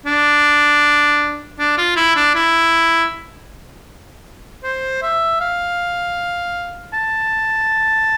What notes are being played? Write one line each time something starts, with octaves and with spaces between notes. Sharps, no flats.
D4
D4
F4
E4
D4
E4
C5
E5
F5
A5